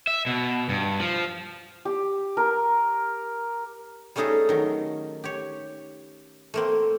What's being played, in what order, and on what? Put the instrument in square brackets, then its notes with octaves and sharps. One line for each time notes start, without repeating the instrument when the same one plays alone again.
[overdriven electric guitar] E5
B2
G2
F3
[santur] G4
A#4
[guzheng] G3 A3 C#4 D#4 G#4 A4
D#3 F#3
G4 C#5
A3 A#3 C4